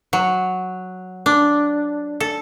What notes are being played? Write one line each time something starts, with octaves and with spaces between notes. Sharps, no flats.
F#3
D4
A4